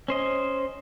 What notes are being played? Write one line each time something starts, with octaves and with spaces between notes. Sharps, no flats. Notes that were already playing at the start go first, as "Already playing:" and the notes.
C#4 C5 D#5